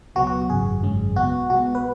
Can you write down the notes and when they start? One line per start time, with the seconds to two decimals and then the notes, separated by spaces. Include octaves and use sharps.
0.15 C#2 B2 F#3 B3 F#4
0.27 F#4
0.49 G#1 F#2 C#3 G#4
0.83 G#1 F#2 C#3 G#3 C#4
1.16 B1 B2 B3 F#4
1.50 B1 B2 G#3 B3 F#4
1.75 B4